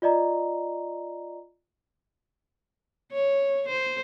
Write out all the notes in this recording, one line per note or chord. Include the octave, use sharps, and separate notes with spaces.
F4 D5 D#5 A#5
C#5
C5